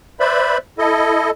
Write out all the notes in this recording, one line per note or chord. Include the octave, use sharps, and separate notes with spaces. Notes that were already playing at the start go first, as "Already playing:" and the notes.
B4 C5 D5 E5 B5
E4 A4 D#5